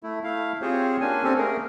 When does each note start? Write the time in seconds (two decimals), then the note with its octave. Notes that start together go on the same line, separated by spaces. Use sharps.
0.03 A3 E4
0.24 A3 E4 F5
0.62 C4 F4 G4 G#4 C5 C#5
1.01 A#3 C#4 D4 G#5
1.24 C4 C#4 G4 A4
1.38 A3 A#3 G#4 A#4